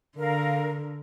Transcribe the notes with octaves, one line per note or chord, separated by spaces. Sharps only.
D3 A#4 F5